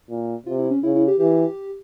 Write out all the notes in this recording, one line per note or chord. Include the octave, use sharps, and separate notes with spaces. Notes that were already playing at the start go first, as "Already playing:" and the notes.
A#2
C3 F4
E4
C#4
C#3 E4
E4
G4
E3 G4